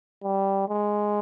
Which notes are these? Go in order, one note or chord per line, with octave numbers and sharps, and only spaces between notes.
G3
G#3